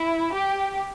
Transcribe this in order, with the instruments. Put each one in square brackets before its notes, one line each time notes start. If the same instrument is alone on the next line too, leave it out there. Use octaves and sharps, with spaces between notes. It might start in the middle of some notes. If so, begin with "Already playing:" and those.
Already playing: [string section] E4
G4